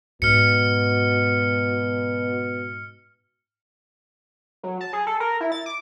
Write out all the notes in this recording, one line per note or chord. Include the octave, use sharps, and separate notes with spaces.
G#2 B2 F6 C#7
F#3
A5
G#4
A4
A#4
E4
A6
D6